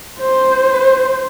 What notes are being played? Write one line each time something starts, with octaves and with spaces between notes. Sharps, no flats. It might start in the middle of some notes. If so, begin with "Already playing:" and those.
C5